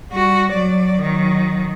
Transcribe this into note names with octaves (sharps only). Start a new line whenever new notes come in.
G3 F#4
F#3 D5
D#3 F#3